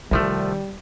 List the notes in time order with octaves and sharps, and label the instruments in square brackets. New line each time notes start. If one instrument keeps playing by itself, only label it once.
[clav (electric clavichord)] C2 F3 A3 [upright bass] D#3 D#4 [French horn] G3